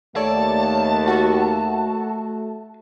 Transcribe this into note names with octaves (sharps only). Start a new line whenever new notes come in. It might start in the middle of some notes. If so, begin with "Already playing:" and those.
D#2 A3 A4 C#5 D5 A5
F#4 A4